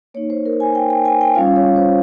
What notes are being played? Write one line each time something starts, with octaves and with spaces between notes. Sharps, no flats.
A#3 D#4 C#5
C5
A#4
G#5
G5
G5
G#5
G5
G3 C#4 F4 F5
C#5
C5